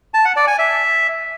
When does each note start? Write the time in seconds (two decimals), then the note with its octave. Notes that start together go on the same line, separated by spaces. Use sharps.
0.14 A5
0.25 F#5
0.36 D5
0.47 G#5
0.58 E5